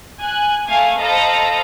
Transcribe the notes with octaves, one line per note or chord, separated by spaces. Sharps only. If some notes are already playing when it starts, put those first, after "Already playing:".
G#5 F#6
A3 F5 G#5
A4 C5 D#5 F5 A#5 B5